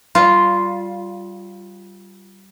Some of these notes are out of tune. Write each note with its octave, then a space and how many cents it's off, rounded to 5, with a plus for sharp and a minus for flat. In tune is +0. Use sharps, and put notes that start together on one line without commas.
G3 -15 F4 +0